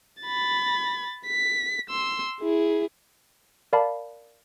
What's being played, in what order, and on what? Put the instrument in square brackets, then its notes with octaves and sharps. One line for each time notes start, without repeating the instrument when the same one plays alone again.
[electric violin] B5 A6
B6
C6 E6
E4 G#4
[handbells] A#4 D5 F5 A5 B5